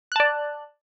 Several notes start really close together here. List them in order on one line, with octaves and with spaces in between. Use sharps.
F#6 A5 D5